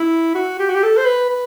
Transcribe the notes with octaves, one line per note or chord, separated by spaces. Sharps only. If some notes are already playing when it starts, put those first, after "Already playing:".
Already playing: E4
F#4
G4
F#4
G4
A4
C5
B4
B4